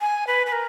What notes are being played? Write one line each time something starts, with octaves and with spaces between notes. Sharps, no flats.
G#5
B4
B4
A#4